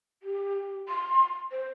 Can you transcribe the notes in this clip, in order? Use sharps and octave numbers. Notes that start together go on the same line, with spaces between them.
G4
C6
C5